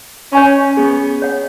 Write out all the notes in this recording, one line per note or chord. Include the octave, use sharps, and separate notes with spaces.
C#4 C#5 G#5 C#6
B3 G#4
C#5 F#5